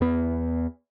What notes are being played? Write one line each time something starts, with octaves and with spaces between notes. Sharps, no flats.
E2 B3